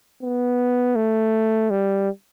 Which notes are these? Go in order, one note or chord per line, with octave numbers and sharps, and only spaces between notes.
B3
A3
G3